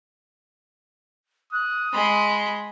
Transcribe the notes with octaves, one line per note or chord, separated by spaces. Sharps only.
D#6 F#6
G#3 B5 C6